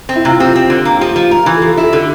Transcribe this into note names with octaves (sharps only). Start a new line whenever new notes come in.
C4
E4
C3 F4
C4 G4
C4
D3
A#3
F4
F3 G4
F4
F3
F4 A#4
E3
A4
F3 G4
A4
E4
A4
D3 G4